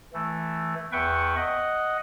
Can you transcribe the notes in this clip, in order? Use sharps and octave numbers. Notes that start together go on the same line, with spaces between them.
E3 A3
E2 B4 E5 F#5 G5 C#6
D#5 F#5